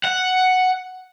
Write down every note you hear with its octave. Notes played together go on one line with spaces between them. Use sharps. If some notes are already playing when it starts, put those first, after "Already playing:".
F#5